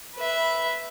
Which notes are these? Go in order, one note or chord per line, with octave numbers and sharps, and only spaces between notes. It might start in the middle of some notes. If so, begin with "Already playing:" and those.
B4 E5